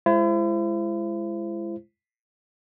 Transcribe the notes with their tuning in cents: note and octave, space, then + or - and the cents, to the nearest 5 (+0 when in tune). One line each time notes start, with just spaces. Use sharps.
G#3 +0 E4 +40 C5 +0